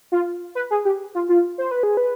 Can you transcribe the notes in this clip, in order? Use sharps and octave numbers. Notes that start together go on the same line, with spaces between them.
F4
B4
G#4
G4
F4
F4
C5
B4
G#4
B4